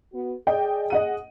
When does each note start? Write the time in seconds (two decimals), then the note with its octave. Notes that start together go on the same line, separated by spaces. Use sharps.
0.13 B3 F#4
0.47 G#4 D5 D#5 G5
0.90 D#5 F#5 D#7